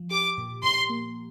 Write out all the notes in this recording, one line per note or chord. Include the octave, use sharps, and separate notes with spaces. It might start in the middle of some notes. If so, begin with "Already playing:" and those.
Already playing: F3
G4 D6
A#2
A#2 C6
A#3